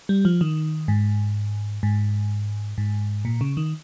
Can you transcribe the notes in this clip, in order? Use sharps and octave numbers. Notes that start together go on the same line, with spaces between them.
G3
F3
D#3
G#2
G#2
G#2
A#2
C#3
D#3